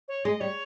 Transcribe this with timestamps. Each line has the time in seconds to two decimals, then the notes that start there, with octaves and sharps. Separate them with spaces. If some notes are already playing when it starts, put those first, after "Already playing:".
0.08 C#5
0.25 G#3 D#5
0.40 G3 C#5